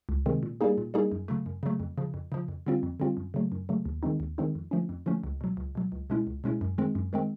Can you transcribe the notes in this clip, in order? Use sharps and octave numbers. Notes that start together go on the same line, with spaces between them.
C#2
C3 D#3 G#3 C4
A#2
G3 A#3 D#4 G#4
A#2
G3 A#3 D#4 G#4
F#2
C#3 F#3 A3
F#2
C#3 F#3 A3
F2
C#3 F3
F2
C#3 F3
F2
D3 G3 C4 F4
F2
D3 G3 C4 F4
F#2
C#3 F#3 A3
F#2
C#3 F#3 A3
D#2
D#3 G#3 C4 D#4
D#2
D#3 G#3 C4 D#4
F2
D3 F3 A3 C#4
F2
D3 F3 A3 C#4
C#2
B2 F#3
C#2
B2 F#3
C#2
B2 G#3 C#4 E4
C#2
B2 G#3 C#4 E4
F#2
D#3 G#3 C4
F#2
D#3 G#3 C4